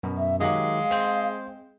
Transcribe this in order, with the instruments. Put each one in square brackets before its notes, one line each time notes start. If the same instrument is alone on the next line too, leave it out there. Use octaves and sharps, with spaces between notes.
[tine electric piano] F#2 B2
[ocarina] E5
[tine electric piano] D#3 F#3 G4 [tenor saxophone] G#3 [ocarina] F5
[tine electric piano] C4 C5